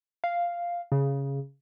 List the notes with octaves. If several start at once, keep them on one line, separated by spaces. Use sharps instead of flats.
F5
C#3